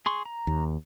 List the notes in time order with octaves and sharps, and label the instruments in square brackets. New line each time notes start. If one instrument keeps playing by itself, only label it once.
[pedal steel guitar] G#4 C6 C#6
A#5
[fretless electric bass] D#2